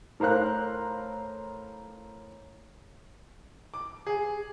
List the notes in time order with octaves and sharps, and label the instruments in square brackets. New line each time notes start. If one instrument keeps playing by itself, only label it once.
[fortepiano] A2 A#4 C5 F5 F#6
[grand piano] D6
G#4